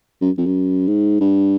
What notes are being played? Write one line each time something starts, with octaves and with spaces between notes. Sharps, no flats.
F#2
F2
F#2
G#2
G2